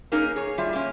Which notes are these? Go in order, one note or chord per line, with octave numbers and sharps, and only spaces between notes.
A#3 C#4 D#4 G#4 A#4
G#4 C#5
A#2 F#3 G3 F4 E5
A#3 C#4